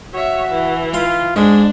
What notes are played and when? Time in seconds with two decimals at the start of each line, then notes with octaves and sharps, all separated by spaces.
0.14 F#4 C#5 E5
0.51 E3
0.93 F4 F5 C6
1.36 G#2 G#3 D4